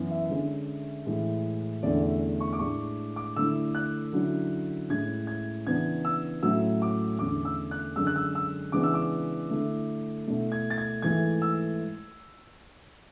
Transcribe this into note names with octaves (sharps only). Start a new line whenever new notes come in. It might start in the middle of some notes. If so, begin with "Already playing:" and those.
Already playing: F#2 E3 B3 E4
E5
D3 G#3 C#4
A2 E3 G#3
E2 D3 A3 C#4 D5
E5
C#6
D6
A2 G#3 D4 C#6
D6
D3 A3 E4 E6
F#6
D3 F#3 C#4 E4
A2 G#3 C#4 E4 G#6
G#6
C#3 E3 B3 D4 G#6
E6
A2 F#3 A3 C#4 E6
D6
E2 D3 A3 C#4 D6
E6
F#6
F#2 D3 G#3 C#4 E6
F#6
E6
E6
C#3 E3 G#3 B3 D4 D6
E6
D6
D3 A3 E4
B2 A3 E4
G#6
A6
G#6
G#2 E3 A3 G#6
E6